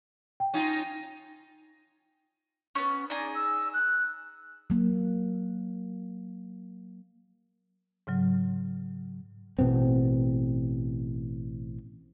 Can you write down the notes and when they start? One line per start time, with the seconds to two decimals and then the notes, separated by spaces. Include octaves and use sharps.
0.40 G5
0.54 C#4 D#4 F4
2.75 B3 C#4
3.10 D#4 G#4 D5
3.35 E6
3.74 F#6
4.70 F#3 A#3
8.07 G#2 C#3 F#3
9.59 A1 B2 B3 C4